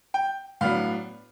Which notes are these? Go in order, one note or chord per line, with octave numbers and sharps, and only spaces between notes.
G5
A2 F#3 B3 D4 F5